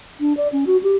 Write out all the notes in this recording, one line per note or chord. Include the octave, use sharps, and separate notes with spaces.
D4
D5
C#4
F#4
G4